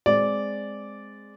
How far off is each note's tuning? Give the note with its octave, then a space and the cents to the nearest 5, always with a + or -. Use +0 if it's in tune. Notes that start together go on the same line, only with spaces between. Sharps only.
G#3 +0 C4 +0 D5 -10